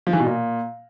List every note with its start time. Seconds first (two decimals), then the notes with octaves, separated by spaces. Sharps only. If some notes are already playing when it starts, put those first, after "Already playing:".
0.07 F3
0.13 E3
0.20 B2
0.26 A#2